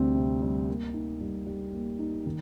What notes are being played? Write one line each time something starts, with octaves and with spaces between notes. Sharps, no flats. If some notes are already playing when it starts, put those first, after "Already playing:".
Already playing: D2 C3 G3 C4
C3
G3
A#3
D#4
G3
G3
A#3
D#4
D#3